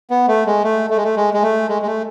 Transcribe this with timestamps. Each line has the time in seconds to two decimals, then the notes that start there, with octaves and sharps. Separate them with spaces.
0.10 B3
0.28 A3
0.47 G#3
0.64 A3
0.90 A3
0.97 G#3
1.04 A3
1.17 G#3
1.34 G#3
1.43 A3
1.69 G#3
1.82 G#3
1.87 A3